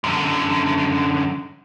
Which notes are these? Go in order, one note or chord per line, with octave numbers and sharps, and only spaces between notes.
F#2 D3